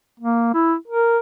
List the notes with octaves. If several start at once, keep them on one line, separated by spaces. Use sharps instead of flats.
A#3
E4
A#4